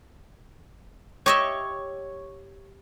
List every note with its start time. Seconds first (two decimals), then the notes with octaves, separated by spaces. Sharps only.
1.26 G4 C#5 D#5 E5